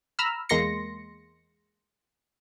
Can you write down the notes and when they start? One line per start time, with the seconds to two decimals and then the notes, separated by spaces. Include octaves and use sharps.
0.19 A#5 B5 E6 F6
0.49 E2 G#3 A#3 C6 A#6 C#7